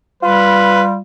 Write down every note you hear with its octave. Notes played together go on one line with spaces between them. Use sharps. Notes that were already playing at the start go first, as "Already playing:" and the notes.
G3 F4 B4